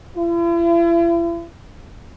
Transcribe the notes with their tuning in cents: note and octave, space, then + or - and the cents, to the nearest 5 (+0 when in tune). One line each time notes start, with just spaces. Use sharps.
E4 +45